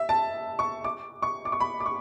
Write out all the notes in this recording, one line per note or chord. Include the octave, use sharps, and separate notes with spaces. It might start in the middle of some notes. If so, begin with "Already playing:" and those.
Already playing: E5
A5
C#6
D6
C#6
D6
C#6
B5
D6
C#6